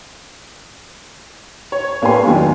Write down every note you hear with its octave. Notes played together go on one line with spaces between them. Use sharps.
C#5
A1 A#3 B3 G4 G#5 C6
E2 D#3 F#3 A#3 G4